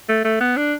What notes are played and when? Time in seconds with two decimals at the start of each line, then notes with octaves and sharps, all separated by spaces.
0.09 A3
0.25 A3
0.40 B3
0.57 D4